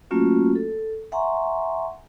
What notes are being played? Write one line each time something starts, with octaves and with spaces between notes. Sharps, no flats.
F#3 A3 A#3 C#4 F4 F#4
A4
E5 F#5 G#5 A#5 C6 C#6